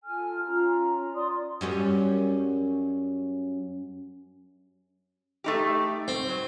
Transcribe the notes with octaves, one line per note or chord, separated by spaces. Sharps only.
F4 A4 G#5 F6
C#4 F4 A#5
D5 C6 D#6
F#2 G3 C#4
A3 D#4 G4
C4
F#3